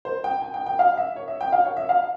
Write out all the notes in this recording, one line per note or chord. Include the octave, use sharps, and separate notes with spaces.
C5
G5
G#5
G5
G5
F5
E5
C#5
E5
G5
F5
C#5
E5
F5